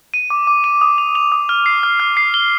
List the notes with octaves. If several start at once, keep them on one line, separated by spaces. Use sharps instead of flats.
D#7
D6
D6
D#7
D#6
F7
F7
D#6
F6
C7
F6
F6
C7
G7